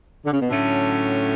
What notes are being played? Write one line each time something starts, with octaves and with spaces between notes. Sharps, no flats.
D3
C#3
B2
A2 D3 F#3 A3 C#4